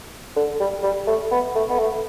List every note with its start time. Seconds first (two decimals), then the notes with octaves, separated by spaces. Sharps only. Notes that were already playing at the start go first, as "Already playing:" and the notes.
0.36 D3
0.60 G3
0.83 G3
1.07 A3
1.31 B3
1.55 A3
1.70 B3
1.79 A3